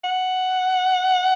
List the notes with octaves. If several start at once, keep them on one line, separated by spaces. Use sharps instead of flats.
F#5